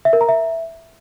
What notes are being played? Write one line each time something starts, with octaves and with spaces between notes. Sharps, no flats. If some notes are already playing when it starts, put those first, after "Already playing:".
E5
A#4
A#5
E5